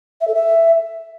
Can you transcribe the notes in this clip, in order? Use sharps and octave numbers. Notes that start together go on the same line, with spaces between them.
E5
A4
E5